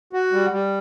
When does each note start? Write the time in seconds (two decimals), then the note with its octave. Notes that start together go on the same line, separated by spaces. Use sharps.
0.13 F#4
0.33 G3
0.52 G3